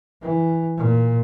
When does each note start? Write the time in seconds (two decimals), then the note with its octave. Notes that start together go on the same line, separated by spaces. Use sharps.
0.22 E3
0.77 A#2